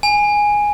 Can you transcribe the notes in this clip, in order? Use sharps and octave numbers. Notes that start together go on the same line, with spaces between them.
G#5